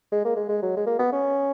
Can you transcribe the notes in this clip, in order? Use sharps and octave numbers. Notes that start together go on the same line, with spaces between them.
G#3
A#3
G#3
G#3
F#3
G#3
A#3
B3
C#4